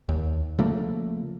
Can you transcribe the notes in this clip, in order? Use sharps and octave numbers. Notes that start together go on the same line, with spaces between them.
D#2
C#3 F3 A3 A#3